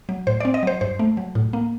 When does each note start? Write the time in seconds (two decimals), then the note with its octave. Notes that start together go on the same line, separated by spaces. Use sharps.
0.09 F#3
0.27 A2 C5
0.40 C4 D5
0.54 D#5
0.63 F#3 C5
0.81 G2 C5
0.99 A3
1.17 F#3
1.35 A2
1.53 A#3